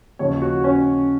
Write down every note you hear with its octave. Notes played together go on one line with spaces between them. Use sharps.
D#2 C#3 F3 C#5
F#4
C#4